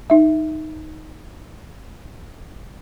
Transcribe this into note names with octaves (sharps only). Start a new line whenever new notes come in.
D#4 E5